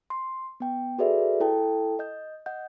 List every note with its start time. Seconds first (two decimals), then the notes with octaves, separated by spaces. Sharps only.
0.10 C6
0.60 B3 G5
0.98 F#4 G#4 A4 B4 D5 E5
1.40 E4 A4 G5 A5
1.99 D#5 G6
2.46 D#5 F#5 G6